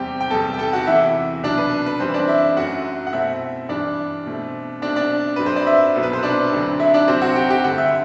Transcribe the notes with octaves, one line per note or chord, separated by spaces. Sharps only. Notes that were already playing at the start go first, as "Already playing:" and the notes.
Already playing: E2 C3 G3 C4 G4 G5
G5
E2 C3 G3 B3 A4 A5
G5
A4 A5
F#4 F#5
E2 C3 E3 E4 E5
C2 B2 F#3 D4 D5
B4
B4
F#2 E3 G3 C4 C5
D4 D5
E4 E5
F#2 F#3 A3 F#4 F#5
F#5
B2 A3 C4 E4 E5
G2 E3 G3 D4 D5
B2 A3 C4
B2 A3 C4 D4 D5
D4 D5
G2 F#3 C4 B4
C5
D5
E4 E5
C2 B2 F#3 B3
B4
C5
D4 D5
D2 D3 F#3 C4
E4 E5
D4 D5
C2 C3 F#3 C4 C5
F#4 F#5
G4 G5
G4 G5
G2 D3 A3 F#5
E5